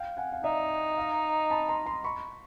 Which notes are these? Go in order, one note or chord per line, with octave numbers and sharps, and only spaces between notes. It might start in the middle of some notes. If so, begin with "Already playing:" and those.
Already playing: F5 G5
F#5 G#5
F5
D#4 D5 E5
D#5 F5
A5 B5
A#5 C6
A#5 C6
B5 C#6